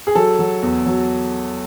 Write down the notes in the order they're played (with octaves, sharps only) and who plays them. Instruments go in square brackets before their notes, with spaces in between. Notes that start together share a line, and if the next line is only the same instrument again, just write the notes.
[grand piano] G#4
F#3 A4
F#3
E2
F#3